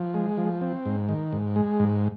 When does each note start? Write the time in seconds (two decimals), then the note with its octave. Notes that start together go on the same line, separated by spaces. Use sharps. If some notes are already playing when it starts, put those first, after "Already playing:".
Already playing: F3
0.14 G#3
0.37 F3
0.61 C4
0.85 G#2
1.09 D#3
1.33 G#2
1.56 G#3
1.79 G#2